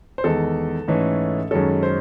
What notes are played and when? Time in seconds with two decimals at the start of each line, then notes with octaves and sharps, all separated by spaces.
0.18 C5
0.24 E2 D#3 G#3 A4
0.88 G#2 E3 A3 C#4
1.51 F#2 D#3 G#3 C#4 A4
1.83 C5